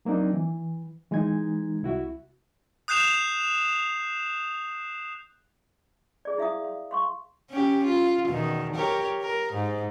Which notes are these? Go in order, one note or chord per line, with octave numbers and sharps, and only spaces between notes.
F#3 A#3 C4 D4 D#4
E3
E3 G#3 D#4 G#6
C2 E4 F#4 E5
D#6 F#6 G6 C7 E7 F7
G#4 D5
E4 E5 F5 D#6
F5
F5 C6 C#6
C#4 G4
F4
E2 B2 D#3
G4 A#4 C#5
A#4
G#2